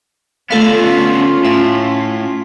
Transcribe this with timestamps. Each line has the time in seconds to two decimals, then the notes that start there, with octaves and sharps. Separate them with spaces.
0.51 D3 A3 B3 C#4 F4 A4 F5
1.45 A2 E5